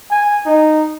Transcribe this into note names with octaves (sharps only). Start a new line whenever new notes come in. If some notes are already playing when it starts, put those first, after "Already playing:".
G#5
D#4